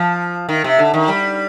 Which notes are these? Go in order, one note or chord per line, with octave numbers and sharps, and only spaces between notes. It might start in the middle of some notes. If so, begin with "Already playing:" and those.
Already playing: F3
D#3
C3
D3
D#3
G3